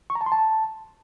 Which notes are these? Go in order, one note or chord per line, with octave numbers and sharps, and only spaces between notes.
C#6
A#5
A5
C6
A5